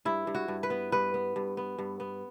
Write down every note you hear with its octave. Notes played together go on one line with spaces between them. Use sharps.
G2 E4
G2
F#4
G2
B4
B3
G2 B4
B3
G2
B3
G2
B3